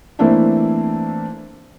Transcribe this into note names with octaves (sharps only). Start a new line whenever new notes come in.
E3 A3 A#3 C4 D4 E4